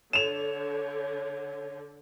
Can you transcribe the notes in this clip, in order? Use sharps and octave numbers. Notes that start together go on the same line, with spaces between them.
D3 C#5 E7 F7